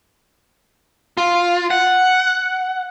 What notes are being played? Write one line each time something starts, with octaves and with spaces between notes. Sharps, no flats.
F4
F#5